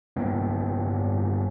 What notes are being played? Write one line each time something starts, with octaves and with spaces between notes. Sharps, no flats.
G2 G3 A#3 B3